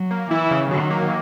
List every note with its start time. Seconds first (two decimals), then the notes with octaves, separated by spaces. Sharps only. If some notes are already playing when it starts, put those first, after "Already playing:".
Already playing: F#3
0.11 A#3
0.31 E3 E4
0.51 C#3
0.71 D#3 F#3
0.91 A#3